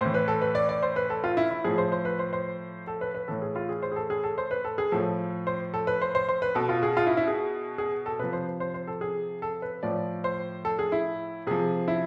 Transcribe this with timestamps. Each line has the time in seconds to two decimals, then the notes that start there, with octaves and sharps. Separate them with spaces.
0.01 A2 E3 C5
0.14 B4
0.28 A4
0.42 B4
0.55 D5
0.69 D5
0.83 C5
0.96 B4
1.10 A4
1.24 F4
1.37 E4
1.51 E4
1.64 A2 F3 G#4
1.78 C5
1.92 C5
2.05 B4
2.19 C5
2.33 C5
2.87 A4
3.01 B4
3.14 B4
3.28 A2 E3 A4
3.42 G#4
3.56 F4
3.69 G#4
3.82 C5
3.92 G#4
3.96 A4
4.10 G#4
4.24 A4
4.38 C5
4.51 B4
4.64 A4
4.78 G#4
4.92 A2 F3 A4
5.47 C5
5.74 A4
5.87 B4
6.02 C5
6.15 C5
6.29 C5
6.42 B4
6.55 B2 A4
6.69 F4
6.83 G#4
6.97 F4
7.07 E4
7.17 E4
7.28 G#4
7.78 G#4
8.06 A4
8.19 C3 F3 B4
8.33 C5
8.60 C5
8.74 C5
8.87 A4
9.01 G#4
9.42 A4
9.62 B4
9.83 A2 F3 D5
10.24 C5
10.65 A4
10.79 G#4
10.92 E4
11.47 C3 F3 G#4
11.88 E4